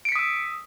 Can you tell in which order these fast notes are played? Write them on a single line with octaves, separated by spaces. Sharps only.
D7 C#7 B6 D#6 E6